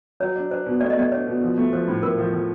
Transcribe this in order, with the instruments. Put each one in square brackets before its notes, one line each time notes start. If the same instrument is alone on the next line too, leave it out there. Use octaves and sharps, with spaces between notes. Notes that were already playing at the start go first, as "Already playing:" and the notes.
[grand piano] F#3 [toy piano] C#5
[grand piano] D4
[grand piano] D4 [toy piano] C5
[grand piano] B2
[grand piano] A3 [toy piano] D5
[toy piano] D#5
[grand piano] A3 [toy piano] D5
[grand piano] D4 [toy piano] C#5
[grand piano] B2
F3
A3
[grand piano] F3 [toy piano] C5
[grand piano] A2
[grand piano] A2 [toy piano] A#4
[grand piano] F3
F3